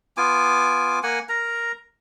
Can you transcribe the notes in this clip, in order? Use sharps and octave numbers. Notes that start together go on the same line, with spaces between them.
B3 F4 G#5 D6
A#3 F#5 G#5
A#4 A#5